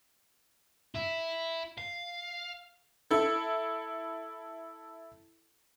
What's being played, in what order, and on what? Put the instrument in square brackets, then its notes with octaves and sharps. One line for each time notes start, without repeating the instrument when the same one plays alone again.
[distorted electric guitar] E4
F5
[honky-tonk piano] E4 A4